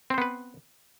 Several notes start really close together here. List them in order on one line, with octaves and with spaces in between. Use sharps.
C4 C5 B3 B4